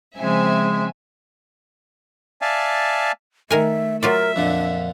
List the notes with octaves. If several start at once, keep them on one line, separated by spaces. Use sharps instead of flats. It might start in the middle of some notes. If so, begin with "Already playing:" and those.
C#3 F3 G#3 C4 E5 G#5
D5 E5 F5 G#5 A5
D#3 A3 A#4 E5 G#5
F#3 F4 A#4 D5 E5
F2 A#2 D3 D4